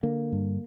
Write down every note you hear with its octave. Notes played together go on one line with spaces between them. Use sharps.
D3 A#3
G2